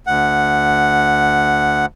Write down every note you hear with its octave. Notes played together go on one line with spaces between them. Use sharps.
D2 F#5